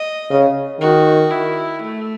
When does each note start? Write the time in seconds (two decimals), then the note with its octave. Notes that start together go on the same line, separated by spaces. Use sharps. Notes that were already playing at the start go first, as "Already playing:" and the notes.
Already playing: D#5
0.30 C#3
0.81 D#3 F#4
1.31 E4
1.81 A3